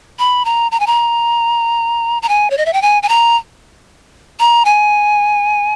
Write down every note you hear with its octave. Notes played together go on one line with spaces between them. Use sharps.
B5
A#5
A#5
G#5
A#5
A#5
G#5
C#5
D#5
E5
G5
G#5
G#5
A#5
A#5
G#5